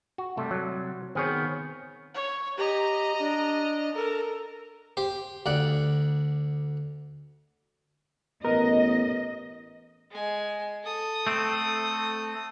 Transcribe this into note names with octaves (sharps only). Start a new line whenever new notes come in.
F#4
C3 G3 A3 A4
F#3
D#3 B3 C4 G#4 C#5
C#5
G4 D#5 A#5
D4
A4 A#4
G4 C5
D2 D5 F#5
A1 B3 A#4 D#5
G#3 G#5
A4 D#6
A3 C4